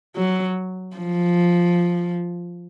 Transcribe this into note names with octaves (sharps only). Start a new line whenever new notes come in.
F#3
F3